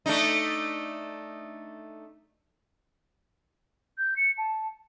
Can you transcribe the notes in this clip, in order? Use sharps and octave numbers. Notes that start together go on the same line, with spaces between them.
A3 D4 D#4
G6
C#7
A5